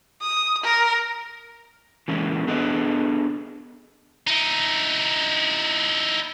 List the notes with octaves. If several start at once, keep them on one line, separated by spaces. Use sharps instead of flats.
D#6
A#4
E3 G#3 A#3 C#4 E4
B3 D4 G#4 A4 B4 D#5
D#4 E4